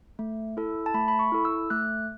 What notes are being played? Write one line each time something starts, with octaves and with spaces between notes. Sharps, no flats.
A3
E4 A4
A5
A3 B5
B5
C#6
E4 A4
E6
A3 F#6